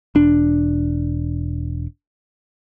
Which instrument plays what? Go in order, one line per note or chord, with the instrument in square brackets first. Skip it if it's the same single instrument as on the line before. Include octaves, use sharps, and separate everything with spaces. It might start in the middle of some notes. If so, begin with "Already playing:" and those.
[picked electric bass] E1 D4